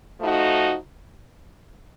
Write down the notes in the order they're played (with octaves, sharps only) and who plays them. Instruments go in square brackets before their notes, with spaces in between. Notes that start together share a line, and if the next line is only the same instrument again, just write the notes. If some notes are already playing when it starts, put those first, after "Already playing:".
[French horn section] F3 A3 D#4 F#4